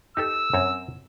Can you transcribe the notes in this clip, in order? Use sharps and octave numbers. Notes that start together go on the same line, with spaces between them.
D#4 G4 A4 E6
F#2 C4 C#5